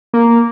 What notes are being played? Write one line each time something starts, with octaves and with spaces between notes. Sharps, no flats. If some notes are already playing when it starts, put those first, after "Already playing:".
A#3